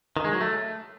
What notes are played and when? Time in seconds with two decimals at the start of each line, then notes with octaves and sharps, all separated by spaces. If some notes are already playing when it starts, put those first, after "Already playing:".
0.17 D#3
0.25 G#3
0.33 F#3
0.41 A3